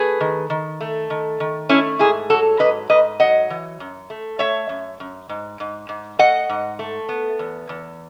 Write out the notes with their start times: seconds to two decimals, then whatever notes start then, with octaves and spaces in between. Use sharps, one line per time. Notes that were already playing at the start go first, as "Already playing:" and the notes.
Already playing: A3 G#4 B4
0.20 D#3
0.50 D#3
0.81 A3
1.10 D#3
1.40 D#3
1.69 A3 C#4 E4
1.99 G#2 E4 G#4
2.30 F#3 F#4 A4
2.59 G#2 B4 D#5
2.90 G#2 B4 D#5
3.20 F#3 D#5 F#5
3.50 E3
3.80 F#2
4.10 A3
4.39 A3 C#5 E5
4.69 F#2
5.00 F#2
5.29 G#2
5.60 G#2
5.89 G#2
6.19 A3 D#5 F#5
6.50 G#2
6.79 A3
7.09 B3
7.39 E2
7.69 E2